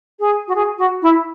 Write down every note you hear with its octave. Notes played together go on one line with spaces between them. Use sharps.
G#4
F#4
G#4
F#4
E4